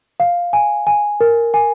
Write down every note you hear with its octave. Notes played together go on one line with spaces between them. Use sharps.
F5
G#5
G#5
A#4
G#5